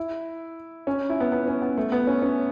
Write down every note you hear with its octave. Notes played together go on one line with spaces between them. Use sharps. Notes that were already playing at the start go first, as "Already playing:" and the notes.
Already playing: E4
C#4
E4
B3
B3
C#4
B3
A3
B3
C#4
C#4